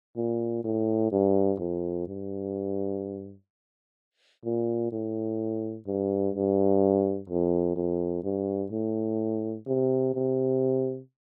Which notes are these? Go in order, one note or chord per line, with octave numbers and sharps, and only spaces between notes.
A#2
A2
G2
F2
G2
A#2
A2
G2
G2
F2
F2
G2
A2
C3
C3